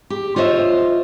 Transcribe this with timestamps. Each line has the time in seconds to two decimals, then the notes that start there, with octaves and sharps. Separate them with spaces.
0.10 G4
0.36 F4 C5 C#5 D#5 E5